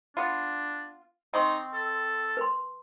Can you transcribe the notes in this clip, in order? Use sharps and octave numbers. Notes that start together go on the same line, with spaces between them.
B3 D4 F4
C4 D#4 D#5 C6 C#6
A4
B4 C6